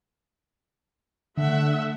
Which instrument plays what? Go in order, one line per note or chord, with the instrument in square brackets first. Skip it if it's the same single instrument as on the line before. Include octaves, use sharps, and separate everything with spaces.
[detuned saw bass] D3 [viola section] A3 E5 F#5